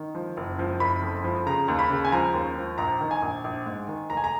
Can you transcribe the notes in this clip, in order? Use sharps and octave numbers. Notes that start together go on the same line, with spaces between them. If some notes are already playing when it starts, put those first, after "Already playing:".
Already playing: D#3
F3
F#1
F3
F#1 B5
F2
F3
C#3 A#5
D#2
B5
C#3
G#5
F3 A#5
D#2
F3
A#1 A#5
D#3
G#5
A#1
A#1
G#2
D#3
F1 A#5
G#5
A#5